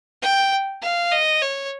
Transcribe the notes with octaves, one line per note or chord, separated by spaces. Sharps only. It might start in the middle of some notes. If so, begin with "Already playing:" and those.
G5
F5
D#5
C#5